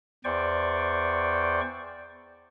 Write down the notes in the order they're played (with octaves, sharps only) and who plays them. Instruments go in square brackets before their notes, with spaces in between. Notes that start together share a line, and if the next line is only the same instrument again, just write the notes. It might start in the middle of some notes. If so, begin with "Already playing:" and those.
[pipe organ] E2 C5 D5 G5 C#6